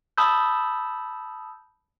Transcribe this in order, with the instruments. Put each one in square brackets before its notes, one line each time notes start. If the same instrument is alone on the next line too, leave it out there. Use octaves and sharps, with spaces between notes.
[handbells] A5 B5 D#6 E6 G6